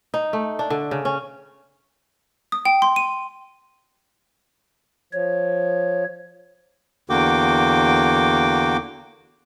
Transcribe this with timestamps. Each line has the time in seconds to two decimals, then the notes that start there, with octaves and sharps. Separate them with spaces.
0.14 D#4
0.33 A3
0.59 D4
0.70 D3
0.91 C#3
1.05 C#4
2.52 D#6
2.65 G5
2.82 C6
2.96 D#7
5.13 F3 C#5
7.10 E2 D3 A#3 F#4 G5 D6